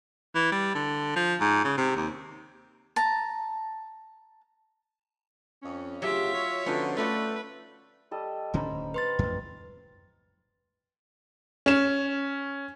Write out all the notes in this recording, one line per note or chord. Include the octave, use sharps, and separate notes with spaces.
E3
G3
D3
F3
G#2
C#3
C3
D#2
A5 A#5
F2 C#4
D2 C#3 F#3 F4 G4 E5
C#5
D3 F3 B3 C#4 D#4
A3 F4 F#4 B4 D5
G3 A4 D#5
D1 D3 C#4 C5 A#5 B5
B4 C6 A6
A1 F2
C#4 E7